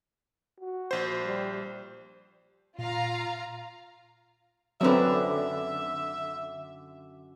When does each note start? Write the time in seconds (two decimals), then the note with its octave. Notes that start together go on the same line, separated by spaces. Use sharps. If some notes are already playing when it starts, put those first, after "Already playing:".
0.60 F#4
0.91 A#1 C5
1.23 G3
2.79 A#2 F4 F5 A#5
4.81 F#2 D3 F#3 C4 B4 E5